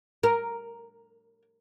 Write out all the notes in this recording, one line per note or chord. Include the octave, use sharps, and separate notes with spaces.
A#4